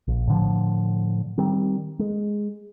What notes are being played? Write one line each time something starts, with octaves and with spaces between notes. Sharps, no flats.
A#1
A2 D3 F3
D#3 G3 C4
G#3